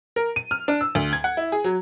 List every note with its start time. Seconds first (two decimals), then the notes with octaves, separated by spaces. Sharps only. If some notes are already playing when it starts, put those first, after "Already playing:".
0.16 A#4
0.36 D#7
0.51 F6
0.68 D4
0.81 E6
0.95 D2
1.13 G#6
1.24 F#5
1.37 E4
1.52 G#4
1.64 F#3